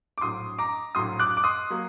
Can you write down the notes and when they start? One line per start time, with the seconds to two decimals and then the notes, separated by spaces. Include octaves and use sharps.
0.18 D6
0.21 A#1 A2 F#3 C6 D#6
0.59 A#5 D6
0.95 A#1 A2 F#3 C6 D#6
1.20 D6 F#6
1.37 D6
1.44 C6 D#6
1.70 F#3 A#3